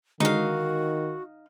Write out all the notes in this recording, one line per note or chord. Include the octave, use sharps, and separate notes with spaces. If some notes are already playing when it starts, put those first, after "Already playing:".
D3 D#3 G#3 D#4 F#4 F5